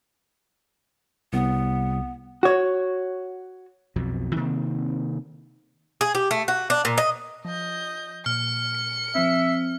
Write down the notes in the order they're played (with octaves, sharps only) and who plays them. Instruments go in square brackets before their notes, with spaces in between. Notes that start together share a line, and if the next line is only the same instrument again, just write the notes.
[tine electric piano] C2 [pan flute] B3
[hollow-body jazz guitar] F#4 C#5
[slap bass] B1 F2 B2
C3 D#3 A#3 C4
[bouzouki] G#4
G4
A3
F#4
D4
A#2
D#5
[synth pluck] F3 [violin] D#5 G6
[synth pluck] A#2 [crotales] F6 [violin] C#7
[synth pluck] F3 C4 [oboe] E5